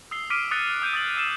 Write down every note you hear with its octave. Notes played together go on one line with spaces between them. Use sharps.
D#6 E6 C7 G7
D6 F6 B6 C7 D7 D#7
D#6 F#6 A6 C#7
D#6 G6 C#7 D#7
D#6 A6 F#7
E6 A6 C7 E7